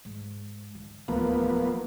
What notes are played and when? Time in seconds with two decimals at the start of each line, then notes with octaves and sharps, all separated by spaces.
0.05 G#2
0.75 D3
1.08 D1 E2 F3 A#3 B3